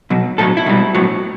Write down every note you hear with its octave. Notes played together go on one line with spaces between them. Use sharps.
B2 F#3
A2 F#3 A4
E4
B2 G3
A2 F#3